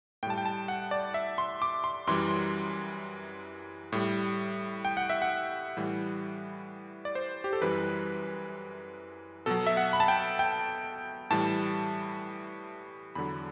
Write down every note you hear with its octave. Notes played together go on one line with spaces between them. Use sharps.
A2 G3 G5 A5
G5
A5
F#5
D5
E5
C6
D6
C6
F#2 E3 G3 C6
A2 G3
G5
F#5
E5
F#5
A2 E3 G3
D5
C5
G4
A4
F#2 E3 G3 B4
B2 F#3 A4
E5
F#5
B5
A5
G5
G5
A2 E3 G3 A5
E2 D3 F#3 B5